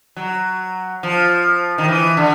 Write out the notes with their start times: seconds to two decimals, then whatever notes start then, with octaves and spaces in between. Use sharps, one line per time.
0.16 F#3
1.03 F3
1.78 D#3
1.88 E3
2.17 D3